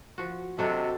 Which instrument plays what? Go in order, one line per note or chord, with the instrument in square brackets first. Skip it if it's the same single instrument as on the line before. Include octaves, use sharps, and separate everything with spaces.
[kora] F3 F#4
[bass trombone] C3 [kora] F#3 D4 F#4 [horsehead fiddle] A4 [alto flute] D#5